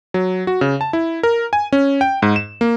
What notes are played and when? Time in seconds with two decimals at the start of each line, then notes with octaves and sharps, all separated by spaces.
0.14 F#3
0.47 F#4
0.61 C#3
0.81 A5
0.93 E4
1.23 A#4
1.53 G#5
1.73 C#4
2.01 G5
2.22 G#2
2.36 E7
2.61 A#3